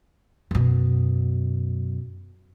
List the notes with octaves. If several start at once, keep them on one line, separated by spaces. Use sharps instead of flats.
F#2 B2